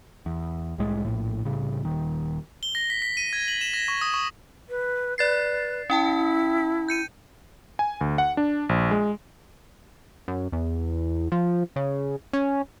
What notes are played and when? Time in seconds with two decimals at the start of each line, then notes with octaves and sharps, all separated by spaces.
0.26 E2
0.78 C2 A2 G#3
1.05 A#1 A2
1.45 C2 A2 C#3
1.84 D#1 D#3
2.63 G7
2.75 A#6
2.90 B6
3.02 B6
3.17 D#7
3.33 G#6
3.48 F#7
3.61 E7
3.74 A#6
3.88 C#6
4.01 D#6
4.14 C#6
4.69 B4
5.18 B4 D5 A6 C7
5.90 C#4 E4 G5 A5
6.88 G6 C#7 D#7
7.79 G#5
8.01 D2
8.18 F#5
8.37 D4
8.69 A#1
8.91 G#3
10.28 F#2
10.52 E2
11.32 F3
11.76 C#3
12.33 C#4